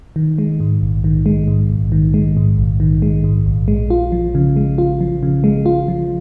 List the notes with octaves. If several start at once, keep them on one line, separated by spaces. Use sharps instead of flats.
D#3
G#3
G#2
A#1
D#3
G#3
G#2
A#1
D#3
G#3
G#2
A#1
D#3
G#3
G#2
A#1
G#3
F4
F3
C#3
G#3
F4
F3
C#3
G#3
F4
F3